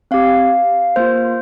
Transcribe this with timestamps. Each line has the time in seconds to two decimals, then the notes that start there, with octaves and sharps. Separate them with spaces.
0.11 C4 G4 F5
0.96 A#3 F4 C5